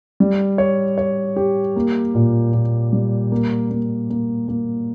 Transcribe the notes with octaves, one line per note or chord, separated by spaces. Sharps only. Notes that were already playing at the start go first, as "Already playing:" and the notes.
G3
C#5
C#5
G4
A#3
A#2
A#2
G3
A#3
A#3
A#3
A#3